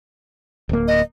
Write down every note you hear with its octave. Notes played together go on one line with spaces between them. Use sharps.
D1 A#3
D#5